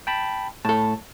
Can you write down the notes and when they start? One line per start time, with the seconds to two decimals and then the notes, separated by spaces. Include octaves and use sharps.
0.07 G5 A5 B5
0.65 A2 A4 A5